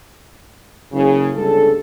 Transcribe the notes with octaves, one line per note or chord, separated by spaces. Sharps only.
F#1 C#3
G1 C#2 G2 A4